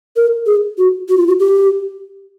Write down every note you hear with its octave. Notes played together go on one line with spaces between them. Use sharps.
A#4
G#4
F#4
F#4
F4
F#4
G4